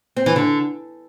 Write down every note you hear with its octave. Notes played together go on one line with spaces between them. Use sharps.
C4
E3
D3